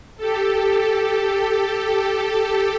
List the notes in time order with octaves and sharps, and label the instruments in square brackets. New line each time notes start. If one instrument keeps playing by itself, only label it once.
[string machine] G4 A4